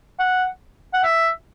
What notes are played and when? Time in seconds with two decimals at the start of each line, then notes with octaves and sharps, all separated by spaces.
0.20 F#5
0.94 F#5
1.04 E5